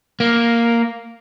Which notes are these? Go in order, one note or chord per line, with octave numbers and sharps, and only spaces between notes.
A#3